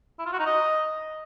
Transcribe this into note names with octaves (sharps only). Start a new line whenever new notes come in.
E4
F4
F#4
D#4
D#5